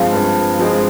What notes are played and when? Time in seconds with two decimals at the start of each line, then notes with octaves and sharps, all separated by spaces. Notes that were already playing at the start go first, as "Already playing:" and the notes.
Already playing: G2 F3 G#3 C4 F5
0.13 G2
0.59 F3 G#3 C4